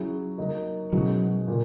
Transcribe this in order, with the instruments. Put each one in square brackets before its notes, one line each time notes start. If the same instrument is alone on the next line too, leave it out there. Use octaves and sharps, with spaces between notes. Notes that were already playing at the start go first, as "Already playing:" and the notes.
Already playing: [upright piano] F#3 C#4 E4 G#4
F#3 A#3 D#4
[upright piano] B2 G#3 C#4 E4 [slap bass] F#3
[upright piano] A#2 A#3